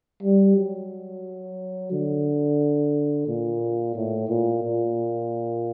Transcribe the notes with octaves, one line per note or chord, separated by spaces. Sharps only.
G3
F#3
D3
A#2
A2
A#2
A#2